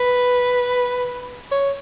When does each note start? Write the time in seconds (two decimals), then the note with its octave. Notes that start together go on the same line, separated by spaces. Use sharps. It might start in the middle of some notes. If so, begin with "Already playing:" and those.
Already playing: B4
1.52 C#5